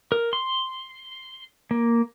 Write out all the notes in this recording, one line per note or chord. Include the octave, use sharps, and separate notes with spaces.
A#4
C6
A#3